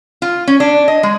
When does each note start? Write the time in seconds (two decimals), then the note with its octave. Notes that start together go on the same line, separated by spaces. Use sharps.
0.22 F4
0.47 C#4
0.60 D4
0.88 D#5
1.03 G#3